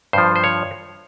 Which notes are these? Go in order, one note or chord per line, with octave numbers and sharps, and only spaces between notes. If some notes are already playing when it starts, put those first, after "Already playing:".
G2 F3 C5
C5
C#5